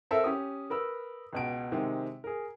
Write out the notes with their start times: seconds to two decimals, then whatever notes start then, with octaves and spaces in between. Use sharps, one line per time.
0.11 C4 A4 A#4 E5
0.24 C#4 G4 D#6
0.70 A#4 B4 E6
1.33 C#2 B2 D7
1.72 C3 D#3 G#3 C4
2.24 G#4 A#4